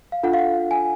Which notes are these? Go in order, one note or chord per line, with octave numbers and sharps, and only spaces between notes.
F5
D4 F4 A4 F#5
F5
F#5
G#5